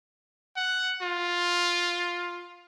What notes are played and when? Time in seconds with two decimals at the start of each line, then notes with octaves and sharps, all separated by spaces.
0.56 F#5
1.02 F4